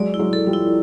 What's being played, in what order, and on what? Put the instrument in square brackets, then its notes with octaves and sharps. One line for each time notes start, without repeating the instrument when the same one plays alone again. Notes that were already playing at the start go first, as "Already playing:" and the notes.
Already playing: [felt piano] F#3 G#3 [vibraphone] D5
[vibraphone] E4
[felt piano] F#3 G#3
[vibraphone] A4
[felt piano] F3 G3
[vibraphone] E4